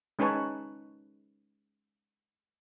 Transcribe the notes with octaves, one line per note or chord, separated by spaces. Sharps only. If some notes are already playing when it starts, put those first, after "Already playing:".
G#3 C#4 D#4 B4 C#5 A5